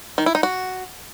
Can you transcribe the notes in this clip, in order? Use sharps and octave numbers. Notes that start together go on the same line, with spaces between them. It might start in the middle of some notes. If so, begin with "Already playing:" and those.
D#3
E4
D#4
F#4